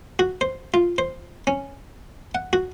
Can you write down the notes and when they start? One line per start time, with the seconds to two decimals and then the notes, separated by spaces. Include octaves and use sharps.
0.19 F#4
0.41 C5
0.74 F4
0.98 C5
1.47 C#4
2.35 F#5
2.53 F#4